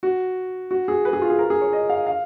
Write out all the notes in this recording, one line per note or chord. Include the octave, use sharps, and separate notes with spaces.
F#4
F#4
G#4
B4
G#4
F4
G#4
A#4
G#4
C#5
D#5
F5
F5